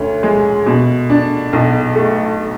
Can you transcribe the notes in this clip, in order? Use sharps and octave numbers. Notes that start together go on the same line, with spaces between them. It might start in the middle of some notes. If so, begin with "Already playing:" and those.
Already playing: D2 C#4
G#3
B2
D4
B1
A3